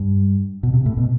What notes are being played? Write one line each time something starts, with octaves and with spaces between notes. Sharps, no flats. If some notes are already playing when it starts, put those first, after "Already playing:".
Already playing: G2
B2
C3
A2
B2